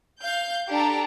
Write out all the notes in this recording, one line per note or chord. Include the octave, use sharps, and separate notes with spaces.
F5 G6
D4 G4 A4 A#5